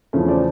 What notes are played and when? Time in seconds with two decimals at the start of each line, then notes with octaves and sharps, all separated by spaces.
0.13 E2 C#3 F3 A3 C#4
0.28 C5 D5